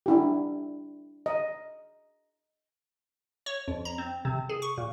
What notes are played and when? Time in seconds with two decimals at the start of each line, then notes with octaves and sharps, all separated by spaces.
0.06 D4 E4 G4
1.26 D#5
3.46 C#5
3.68 F2
3.85 A#5
3.98 C4
4.25 C3
4.49 G#4
4.62 C#6
4.78 A#2